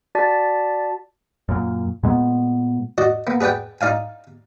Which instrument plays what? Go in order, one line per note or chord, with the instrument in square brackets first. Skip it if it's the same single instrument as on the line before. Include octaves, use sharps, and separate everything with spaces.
[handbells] F#4 D5 A5 A6 B6
[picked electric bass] F#2 A#2
A#2 G#3 B3
[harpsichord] F#4 D5 D#5
A#3 B3
G#4 B4 D5 F#5 G5
D#4 D5 F5 G#5